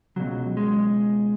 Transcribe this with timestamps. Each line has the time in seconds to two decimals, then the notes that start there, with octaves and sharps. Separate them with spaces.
0.16 C#2 B2 F#3
0.57 G#3